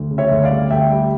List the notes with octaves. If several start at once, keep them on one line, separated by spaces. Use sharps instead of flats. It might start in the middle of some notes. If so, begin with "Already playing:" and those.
Already playing: D2
C#3
C#5 E5
D2
D5 F5
G3
D2 E5 G5
G3